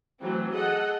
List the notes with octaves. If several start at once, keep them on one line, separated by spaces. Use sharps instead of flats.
E3 F#3 A3 C4
G#4 A4 D#5 F#5